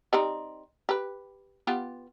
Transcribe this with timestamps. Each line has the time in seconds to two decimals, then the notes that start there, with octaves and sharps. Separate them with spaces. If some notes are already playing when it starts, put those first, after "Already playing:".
0.13 G3 C4 D#4
0.89 G4 B4
1.67 B3 F4 G4